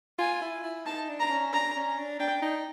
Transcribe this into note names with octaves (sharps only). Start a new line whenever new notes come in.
F4 G#5
E4
E4
D#4 A5
D4
A#5
C#4
D4 A#5
C#4
D4
D4 G5
D#4